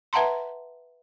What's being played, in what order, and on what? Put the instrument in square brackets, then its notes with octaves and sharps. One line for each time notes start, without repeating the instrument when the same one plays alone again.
[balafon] B4 E5 F#5 A5 A#5 C6